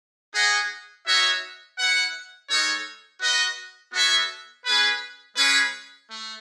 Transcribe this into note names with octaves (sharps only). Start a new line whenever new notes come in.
D#4 G#4 D#5 F#5
D#4 F#4 C#5 E5
E4 B4 F#5
G#3 D#4 A4 C#5
F#4 B4 D#5
B3 F#4 A4 C#5 E5
C#4 G#4 B4
G#3 C#4 G#4 B4
A3